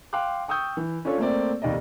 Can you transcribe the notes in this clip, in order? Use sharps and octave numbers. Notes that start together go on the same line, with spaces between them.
F5 G5 C6 D6 F#6
G5 C#6 D#6 E6 G6
E3
C#4 D4 F4 A4 C#5
A3 A#3 C4 D5
F1 D#2 D5 D#5